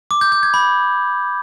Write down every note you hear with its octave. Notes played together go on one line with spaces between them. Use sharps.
D6
G6
G6
G#6
B5